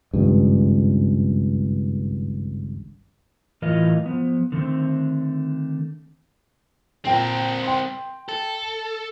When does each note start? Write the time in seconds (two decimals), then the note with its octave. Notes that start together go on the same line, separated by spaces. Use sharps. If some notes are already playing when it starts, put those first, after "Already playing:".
0.14 G#1 C#2 G2
3.62 A2 E3 F4 A#4 D#5 F5
4.06 F3 B3
4.52 D3 D#3 A3 C4
7.05 A#2 C4 A#4 G5
7.63 G5 C6
8.29 A4